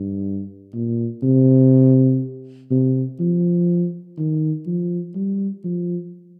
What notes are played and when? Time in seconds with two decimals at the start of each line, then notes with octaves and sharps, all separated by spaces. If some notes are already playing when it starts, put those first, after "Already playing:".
Already playing: G2
0.74 A#2
1.23 C3
2.71 C3
3.20 F3
4.18 D#3
4.66 F3
5.15 G3
5.64 F3